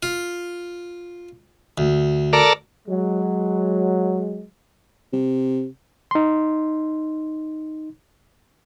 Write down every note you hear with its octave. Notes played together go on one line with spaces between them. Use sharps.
F4
D2
A4 A#4 D5
F#3 G#3
C3
D#4 C6